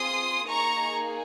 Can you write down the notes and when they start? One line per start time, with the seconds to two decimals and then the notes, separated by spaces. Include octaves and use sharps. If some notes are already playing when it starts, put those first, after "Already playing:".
Already playing: C4 F4 G#4 C6 D#6
0.47 A#3 D#4 G#4 A#5 C#6